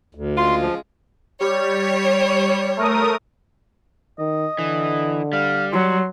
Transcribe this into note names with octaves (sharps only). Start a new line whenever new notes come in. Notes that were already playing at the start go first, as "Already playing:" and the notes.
D2
C#3 G#3 F4 C6
F3
G3 C#5
A3 A#4 D#6
D#3 D#5
D3 E3
G3 F5
F#3 C6